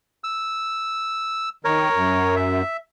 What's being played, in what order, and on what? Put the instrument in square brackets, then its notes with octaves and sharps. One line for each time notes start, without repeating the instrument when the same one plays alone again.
[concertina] E6
[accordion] D#3 [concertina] A#4 C#5
[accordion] F#2
[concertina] E5